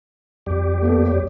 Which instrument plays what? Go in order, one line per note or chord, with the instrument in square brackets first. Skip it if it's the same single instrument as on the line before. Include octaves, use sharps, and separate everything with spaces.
[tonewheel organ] F2 G3 G4
[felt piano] A#3 B3 A4
C#5